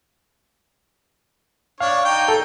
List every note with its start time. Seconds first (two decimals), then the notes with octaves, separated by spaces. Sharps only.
1.81 D4 C#5 F5
2.05 D#4 G5
2.28 A4